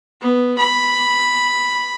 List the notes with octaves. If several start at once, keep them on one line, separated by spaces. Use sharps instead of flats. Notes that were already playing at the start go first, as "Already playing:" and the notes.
B3
B5